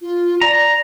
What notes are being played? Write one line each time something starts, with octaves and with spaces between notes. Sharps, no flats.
F4
D5 A#5